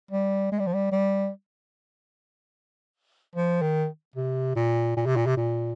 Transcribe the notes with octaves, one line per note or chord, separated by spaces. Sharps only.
G3
G#3
G3
F3
G3
G3
F3
D#3
C3
A#2
A#2
C3
A#2
C3
A#2